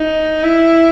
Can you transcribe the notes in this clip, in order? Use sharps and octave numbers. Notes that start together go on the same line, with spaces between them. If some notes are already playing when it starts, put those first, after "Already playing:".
Already playing: D#4
E4